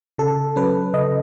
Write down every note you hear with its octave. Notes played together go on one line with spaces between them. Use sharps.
C#3 A4
F#3 C#4 B4
C#3 D#5